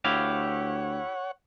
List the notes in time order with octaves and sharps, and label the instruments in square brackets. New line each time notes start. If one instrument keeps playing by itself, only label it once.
[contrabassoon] D2 [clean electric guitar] E4 G4 F5 [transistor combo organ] C#5 F#5